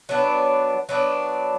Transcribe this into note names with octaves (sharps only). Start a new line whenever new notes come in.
F#3 B3 D4
F#3 B3 D4